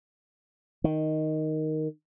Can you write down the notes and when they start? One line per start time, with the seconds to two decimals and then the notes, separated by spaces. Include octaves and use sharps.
0.84 D#3